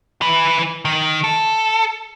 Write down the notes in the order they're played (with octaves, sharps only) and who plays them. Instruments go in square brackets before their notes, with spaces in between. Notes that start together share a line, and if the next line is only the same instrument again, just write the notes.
[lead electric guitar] E3 B4
D#3
A4